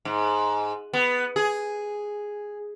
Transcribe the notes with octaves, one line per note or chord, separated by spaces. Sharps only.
G#2
B3
G#4